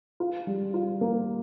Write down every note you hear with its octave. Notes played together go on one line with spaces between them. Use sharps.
F4
G3
F4
A#3